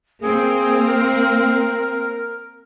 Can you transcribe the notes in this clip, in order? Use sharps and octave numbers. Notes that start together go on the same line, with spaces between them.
A#3 C4 G#4
A#4